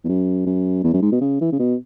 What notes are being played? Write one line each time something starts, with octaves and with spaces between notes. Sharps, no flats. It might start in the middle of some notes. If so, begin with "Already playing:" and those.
E2
F#2
F#2
E2
F#2
G#2
B2
C#3
E3
C#3
B2